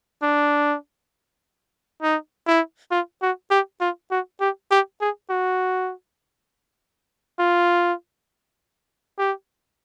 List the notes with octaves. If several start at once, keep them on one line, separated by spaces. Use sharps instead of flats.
D4
D#4
E4
F4
F#4
G4
F4
F#4
G4
G4
G#4
F#4
F4
G4